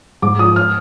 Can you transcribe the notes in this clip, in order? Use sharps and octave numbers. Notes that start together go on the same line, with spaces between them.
G#2 D6
F3 D#6
F6